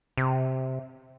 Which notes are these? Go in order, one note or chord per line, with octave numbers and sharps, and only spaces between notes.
C3